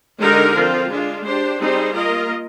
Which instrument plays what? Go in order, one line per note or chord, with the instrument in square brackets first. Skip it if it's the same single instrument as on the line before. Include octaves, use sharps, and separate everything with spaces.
[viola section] D3 G#3 D#4 G4 A#4
F3 C4 F4
G#3 D4 F4
D4 G4 C5
G3 C4 D#4 G#4 C5
A#3 F4 A#4 D#5